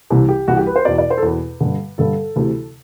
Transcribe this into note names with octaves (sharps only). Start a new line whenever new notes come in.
C2 C3 E3
G4
C2 C3 E3 F#4
G4
B4
C5
E2 B2 D5
D5
C5
A4
E2 B2 B4
G2 D3
G2 D3 A4
D2 C3 E3